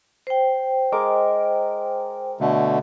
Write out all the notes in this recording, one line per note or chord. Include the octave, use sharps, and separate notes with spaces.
C5 G5
G#3 A#4 D6
B2 D3 A3